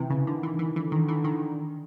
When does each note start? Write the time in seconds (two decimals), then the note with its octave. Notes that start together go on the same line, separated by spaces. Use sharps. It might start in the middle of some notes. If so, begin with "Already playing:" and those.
Already playing: C3 E3
0.10 C#3
0.27 D3 D#3
0.43 E3
0.59 E3
0.76 D3 E3
0.92 D#3
1.08 E3
1.24 D#3